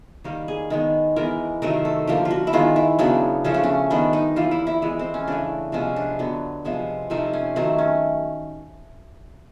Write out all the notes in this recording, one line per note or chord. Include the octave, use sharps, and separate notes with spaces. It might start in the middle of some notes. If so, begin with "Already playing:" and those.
D#3 G3 A#3 G4
G#4
D#3 G#3 B3
E3 G#3 B3 A#4
C3 D#3 F#3 A3 A#4
A4
D3 F3 A#3 G4
F4
F#4
E4
D#3 G#3 B3 F4
E4
C#3 F#3 B3 D4
C#3 F3 A3 C#4
D4
C#4
D#3 G3 B3 D4
D#4
E3 G3 A#3 F4
E4
E4
E3 G#3 B3
C4
C#4
C#3 E3 A3 D4
C3 F3 G#3 B3 C#4
D4
D3 F#3 B3
C3 F3 G#3 B3
C3 F3 A3 D#4
C#4
D#3 F#3 A3 C4
C#4